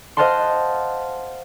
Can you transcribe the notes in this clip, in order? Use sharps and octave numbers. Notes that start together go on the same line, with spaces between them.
C5 D#5 F5 F#5 A5 C6